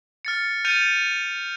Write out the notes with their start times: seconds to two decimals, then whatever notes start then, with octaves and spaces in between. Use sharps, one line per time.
0.25 F6 A6 C#7
0.65 F6 G6 A6 C#7 D#7 F7